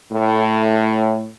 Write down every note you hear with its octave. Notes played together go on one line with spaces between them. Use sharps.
A2